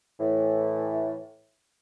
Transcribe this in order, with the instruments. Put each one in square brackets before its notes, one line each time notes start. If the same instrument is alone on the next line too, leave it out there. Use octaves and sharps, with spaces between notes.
[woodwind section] A2 E3